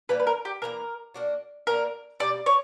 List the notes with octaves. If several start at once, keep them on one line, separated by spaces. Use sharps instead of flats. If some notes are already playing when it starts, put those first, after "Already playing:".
E3 G3 A#3 B4
B4
A#4
G4
E3 G3 A#3 A#4
A#3 D4 F#4
A#3 D4 F#4 A#4
B2 G3 A#3 D5
C#5